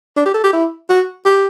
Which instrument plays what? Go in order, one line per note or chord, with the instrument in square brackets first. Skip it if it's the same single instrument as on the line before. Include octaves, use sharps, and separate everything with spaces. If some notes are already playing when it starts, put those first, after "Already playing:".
[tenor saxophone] D4
G4
A4
G4
E4
F#4
G4